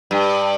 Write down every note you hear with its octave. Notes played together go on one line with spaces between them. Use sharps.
G2